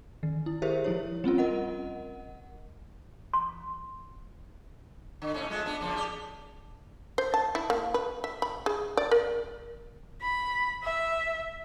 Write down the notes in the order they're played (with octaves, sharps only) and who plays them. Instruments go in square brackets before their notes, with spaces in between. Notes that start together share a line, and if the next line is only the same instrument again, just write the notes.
[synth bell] D#3
E4
G4 G#4 A#4 C5 E5
F3 E4 C#5
G3 C4 C#4 F4
A#4 D#5 F#5
[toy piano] C6
[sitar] D3
A2 C3 C#4
G#3 A3 F4
B3 D4
C#3 F3 A#3
G4 G#4 D5
[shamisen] C5
A5
E4
A#3
B4
E5
B5
G#4
D5
A#4
[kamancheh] B5
E5